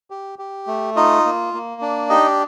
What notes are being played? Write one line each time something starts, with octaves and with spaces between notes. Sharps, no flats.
G4
G4
A3
D#4 F4 D#5
A#3
A#3
D4
D#4 G4 D#5